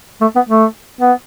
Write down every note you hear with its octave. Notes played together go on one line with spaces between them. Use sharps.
A3
B3
A3
B3